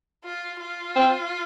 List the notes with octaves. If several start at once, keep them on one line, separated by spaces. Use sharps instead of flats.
F4
F4
C4